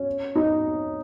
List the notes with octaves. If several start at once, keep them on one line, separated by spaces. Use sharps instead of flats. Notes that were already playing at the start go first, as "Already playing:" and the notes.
Already playing: C#4
D#4